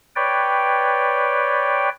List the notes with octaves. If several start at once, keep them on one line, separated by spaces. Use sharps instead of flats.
B4 C#5 D5 G5